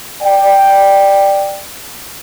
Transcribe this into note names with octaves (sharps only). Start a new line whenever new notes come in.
D5 G5